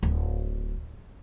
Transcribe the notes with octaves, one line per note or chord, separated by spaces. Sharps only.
D1